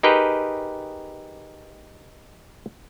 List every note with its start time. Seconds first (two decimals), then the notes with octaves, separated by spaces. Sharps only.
0.03 D#4 G4 G#4 A#4 B4 G5